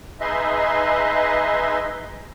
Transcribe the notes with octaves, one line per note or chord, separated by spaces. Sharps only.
D#4 G#4 B4 D#5 E5 C6